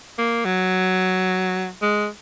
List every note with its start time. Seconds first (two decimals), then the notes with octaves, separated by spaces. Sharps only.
0.18 A#3
0.45 F#3
1.82 G#3